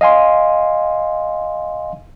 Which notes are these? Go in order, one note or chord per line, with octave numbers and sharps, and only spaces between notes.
D#5 F5 G#5 C6